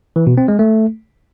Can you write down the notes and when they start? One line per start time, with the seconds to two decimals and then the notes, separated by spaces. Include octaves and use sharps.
0.16 E3
0.27 B2
0.37 C4
0.48 G#3
0.59 A3